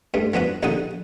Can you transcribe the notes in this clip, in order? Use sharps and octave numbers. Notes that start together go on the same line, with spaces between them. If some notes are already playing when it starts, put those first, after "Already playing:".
G2 A3
F3 B3 D4 F#4
A#1 D#2 D3 F#5 C#6 D#6